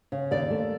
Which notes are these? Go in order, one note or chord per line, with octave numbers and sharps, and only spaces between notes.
C#3
D#2 D5
A3